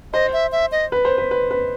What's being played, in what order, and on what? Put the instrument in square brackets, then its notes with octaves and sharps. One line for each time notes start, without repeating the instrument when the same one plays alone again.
[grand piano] C5 [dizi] D#5
[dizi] E5
E5
D#5
[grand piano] B4
C5
B4
B4
B4